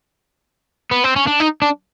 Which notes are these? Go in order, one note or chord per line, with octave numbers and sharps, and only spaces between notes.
B3
C4
C#4
D4
D#4
D4